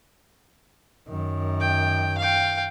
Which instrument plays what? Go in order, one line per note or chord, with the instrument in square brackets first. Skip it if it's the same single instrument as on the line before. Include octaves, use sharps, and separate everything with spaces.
[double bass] F#2 D#3
[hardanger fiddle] G5
F5 G5